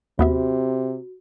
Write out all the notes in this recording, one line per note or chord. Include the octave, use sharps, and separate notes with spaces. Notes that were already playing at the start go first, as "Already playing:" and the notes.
D#2 C3 B3 F#4 E5